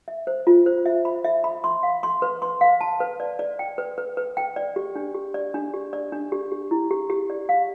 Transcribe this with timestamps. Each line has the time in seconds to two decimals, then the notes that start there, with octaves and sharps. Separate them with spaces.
0.08 E5
0.27 C5
0.47 F4
0.66 C5
0.86 E5
1.05 B5
1.25 E5
1.44 B5
1.64 C6
1.83 F5
2.03 C6
2.22 B4
2.42 C6
2.61 F5
2.81 A5
3.00 B4
3.20 D5
3.39 D5
3.59 G5
3.78 B4
3.98 B4
4.17 B4
4.37 G5
4.56 D5
4.76 G4
4.95 D4
5.15 G4
5.34 D5
5.54 D4
5.74 G4
5.93 D5
6.12 D4
6.32 G4
6.52 G4
6.71 E4
6.91 G4
7.10 G4
7.30 D5
7.49 F5